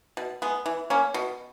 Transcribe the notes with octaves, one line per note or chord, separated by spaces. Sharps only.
B2
G#3 B3
E3
A#3 C#4
B2